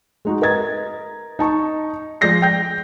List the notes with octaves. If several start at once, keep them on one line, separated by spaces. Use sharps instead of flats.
G#3 D#4 F#4
A#4 B4 D#5 A#5 G#6 A6
D#4 A5 C#6
F3 G#3 D5 G6 A#6 C7
G5 G6